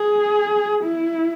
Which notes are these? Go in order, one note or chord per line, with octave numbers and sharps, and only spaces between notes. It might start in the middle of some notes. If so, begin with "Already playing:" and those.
Already playing: G#4
E4